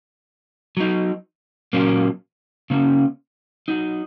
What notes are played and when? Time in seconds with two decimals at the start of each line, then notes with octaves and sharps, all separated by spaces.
0.77 F#3 D#4
1.73 A#2 F#3 A#3 C#4
2.70 C#3 A#3 C#4
3.68 F#3 D#4